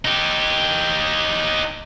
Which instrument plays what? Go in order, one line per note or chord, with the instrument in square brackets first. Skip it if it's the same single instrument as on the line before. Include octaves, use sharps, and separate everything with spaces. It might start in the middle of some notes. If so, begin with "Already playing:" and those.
[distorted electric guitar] D#4 G4